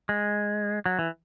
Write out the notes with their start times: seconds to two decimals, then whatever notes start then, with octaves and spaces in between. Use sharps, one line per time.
0.09 G#3
0.86 F#3
0.99 E3